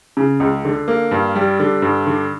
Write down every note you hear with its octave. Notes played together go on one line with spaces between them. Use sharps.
C#3
C#2
D3
A#3
G2
G3
D3
G2
D3